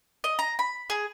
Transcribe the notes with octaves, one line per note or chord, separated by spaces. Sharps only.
D#5
A#5
B5
G#4